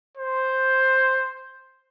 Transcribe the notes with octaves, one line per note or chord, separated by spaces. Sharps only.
C5